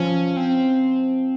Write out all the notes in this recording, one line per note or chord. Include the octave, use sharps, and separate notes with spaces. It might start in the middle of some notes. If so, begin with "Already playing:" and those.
Already playing: F3 C#4
C4